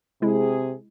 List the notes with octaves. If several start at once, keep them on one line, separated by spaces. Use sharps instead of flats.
C3 G#3 E4 G#4